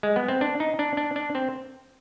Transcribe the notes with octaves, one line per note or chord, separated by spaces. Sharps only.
G#3
B3
C4
D4
D#4
D4
D4
D4
C4